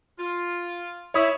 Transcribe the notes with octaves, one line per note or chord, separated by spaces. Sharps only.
F4
E4 C#5 B5 D#6